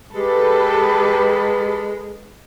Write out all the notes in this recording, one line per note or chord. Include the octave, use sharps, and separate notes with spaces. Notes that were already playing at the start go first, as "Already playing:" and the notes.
G#3 G4 A4 B4